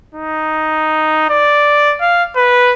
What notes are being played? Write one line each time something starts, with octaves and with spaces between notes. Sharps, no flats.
D#4
D5
F5
B4